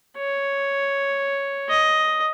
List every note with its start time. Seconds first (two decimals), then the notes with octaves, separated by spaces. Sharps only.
0.17 C#5
1.69 D#5